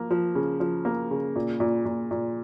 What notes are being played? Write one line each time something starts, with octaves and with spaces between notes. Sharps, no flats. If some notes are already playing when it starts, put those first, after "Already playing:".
Already playing: F3 A#3
F3
C#3
F3
A#3
C#3
A#2
A#2
A#2
A#2